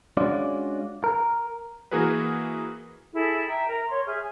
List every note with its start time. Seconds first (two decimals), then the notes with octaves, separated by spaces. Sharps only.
0.17 G#3 C#4 D4 F4 F#4 D5
1.04 A#4
1.91 E3 A#3 F#4 G#4 A#4 B4
3.13 E4 G#4 A4
3.48 E5 G5 A#5
3.68 A#4
3.88 C#5 C6
4.05 G#4 E5 F6 G6
4.17 G#5